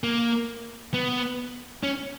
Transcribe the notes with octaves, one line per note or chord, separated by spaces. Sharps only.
A#3
B3
C#4